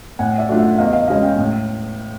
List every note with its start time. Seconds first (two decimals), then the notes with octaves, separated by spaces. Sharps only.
0.19 A2 F#5 G#5
0.38 D5 E5
0.49 F#3 A3 D4 F4
0.58 E5 F#5
0.78 E2 D#5 F5
0.93 D#5 F5
1.08 B2 G#3 C#4 D#5 F5
1.23 F5 G5
1.38 A2